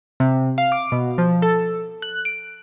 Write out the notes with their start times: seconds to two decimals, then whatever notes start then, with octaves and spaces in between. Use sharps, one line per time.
0.20 C3
0.58 F5
0.72 D6
0.92 B2
1.18 F3
1.42 A4
2.02 F#6
2.25 D7